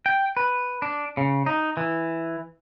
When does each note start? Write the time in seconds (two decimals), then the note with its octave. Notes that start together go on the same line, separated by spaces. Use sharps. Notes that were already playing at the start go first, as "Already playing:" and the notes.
0.06 G5
0.37 B4
0.82 D4
1.17 C#3
1.46 D#4
1.77 E3